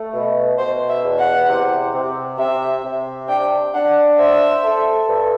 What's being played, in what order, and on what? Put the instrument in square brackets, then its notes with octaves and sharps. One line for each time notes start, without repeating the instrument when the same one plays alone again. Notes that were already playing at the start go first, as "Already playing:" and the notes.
Already playing: [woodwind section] A3
B2
[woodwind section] B2 [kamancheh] C5
[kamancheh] E5
[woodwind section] E2
[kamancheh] F#5
[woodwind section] C3
C3
[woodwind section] C3 [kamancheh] E5
[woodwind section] C3
[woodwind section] D4 [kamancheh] G5
[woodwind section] D4 [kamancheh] F#5
[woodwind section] C5 [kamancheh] E5
[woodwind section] A4
G2